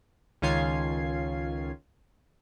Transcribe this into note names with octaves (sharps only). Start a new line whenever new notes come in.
C#2 D#3 C#4 F4 G#6 C7